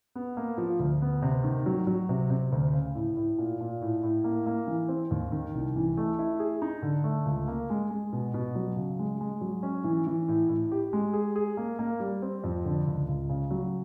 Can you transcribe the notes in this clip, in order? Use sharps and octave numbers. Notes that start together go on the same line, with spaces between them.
B3
A#3
F3
D2
B3
C3
D#3
F#3
F#3
C3
C3
D2
C#3
A2
A2
A#2
A#2
A2
A2
A#3
A#3
E3
C4
D#2
D#3
C2
E3
A3
E4
G#4
D#4
D3
A3
C#2
A#3
G#3
G#3
B2
B2
F#3
C#3
G#3
G#3
F#3
C#4
E3
E3
A2
A2
G4
G#3
G#4
G#4
A#3
A#3
G3
C4
F2
D3
C#2
C#2
C#3
F#3